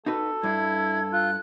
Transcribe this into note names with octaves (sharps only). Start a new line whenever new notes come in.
D#4 F#4 A4 B4
G2 E4 G#6
F4 F#6